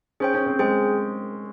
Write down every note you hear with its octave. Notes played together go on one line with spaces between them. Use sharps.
C#4 G#4 C5 G5
C#4
C4
G#3 G#4 C5 G5